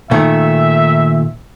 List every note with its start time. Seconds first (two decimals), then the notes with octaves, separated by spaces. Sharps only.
0.11 A#2 D#3 A3 E5